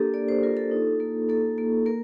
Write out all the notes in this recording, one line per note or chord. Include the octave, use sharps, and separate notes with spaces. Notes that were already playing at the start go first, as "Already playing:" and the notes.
Already playing: A#3 D4 G4 A4 A#4
A#3 D5
C5
F4 A#4
A4
D#4
A#3
A#3 A4
A#3
A#3 A#4